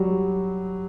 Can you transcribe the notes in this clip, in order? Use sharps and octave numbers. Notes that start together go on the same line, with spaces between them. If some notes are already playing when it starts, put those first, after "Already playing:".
Already playing: F#3 G3